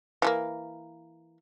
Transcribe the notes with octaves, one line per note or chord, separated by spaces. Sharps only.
E3 F3 A#3